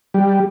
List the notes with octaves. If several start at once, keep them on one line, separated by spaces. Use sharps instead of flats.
G3